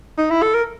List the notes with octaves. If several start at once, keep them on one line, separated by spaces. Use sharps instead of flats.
D#4
E4
A4
A#4